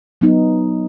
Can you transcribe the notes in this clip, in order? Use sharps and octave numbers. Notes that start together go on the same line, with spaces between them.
F#3 B3 D#4